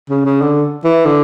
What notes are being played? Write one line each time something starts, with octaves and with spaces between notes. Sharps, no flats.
C#3
C#3
D3
E3
D3